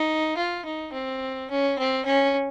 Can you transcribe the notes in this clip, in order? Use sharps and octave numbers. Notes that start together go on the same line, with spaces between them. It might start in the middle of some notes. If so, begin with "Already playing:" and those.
Already playing: D#4
F4
D#4
C4
C#4
C4
C#4